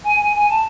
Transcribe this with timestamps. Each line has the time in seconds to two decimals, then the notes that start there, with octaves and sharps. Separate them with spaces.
0.04 G#5
0.19 G#5
0.33 G#5
0.49 A5